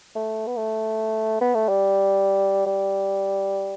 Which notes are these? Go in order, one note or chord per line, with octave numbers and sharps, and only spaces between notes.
A3
B3
A3
B3
A3
G3
G3